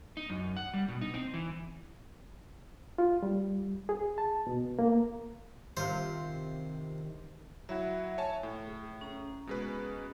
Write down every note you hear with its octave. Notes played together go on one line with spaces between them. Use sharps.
D#4
F#2
F#5
G3
B2
D#4
C4
E3
F4
G3
G#4
A5
B2
A#3
C3 D#3 F4 C5
F#3 E4 E5 F#5
C#5 G#5 A5
A2
G#4
C#4 A#5
B2 G#3 B4